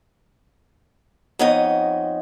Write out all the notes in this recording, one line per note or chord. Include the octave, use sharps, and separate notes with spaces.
F2 B3 D#4 C#5 D#5